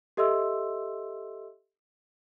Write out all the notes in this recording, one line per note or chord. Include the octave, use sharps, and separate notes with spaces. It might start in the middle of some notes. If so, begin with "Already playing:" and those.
G4 A4 D#5 E5 C6 E6